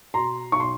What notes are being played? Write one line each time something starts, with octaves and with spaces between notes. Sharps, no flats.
B2 A#5 C6
B1 C#6
C6